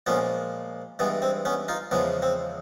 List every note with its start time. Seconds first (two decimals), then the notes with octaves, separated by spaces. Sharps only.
0.06 A#2 F3 G#3 B3 C#4
0.99 G2 E3 G#3 B3
1.22 C4
1.45 B3 C#4
1.68 D#4 F4
1.91 E2 C#3 F3 G#3 B3
2.22 C4